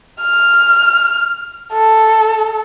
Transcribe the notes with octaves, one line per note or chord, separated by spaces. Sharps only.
F6
A4